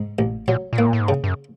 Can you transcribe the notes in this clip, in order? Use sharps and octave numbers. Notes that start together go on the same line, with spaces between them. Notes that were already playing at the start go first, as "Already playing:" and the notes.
Already playing: G#2
A1
A#2 F#3
A#2
A2 A#3
A#2
A2
G#2
G2 C#3
G2
F#2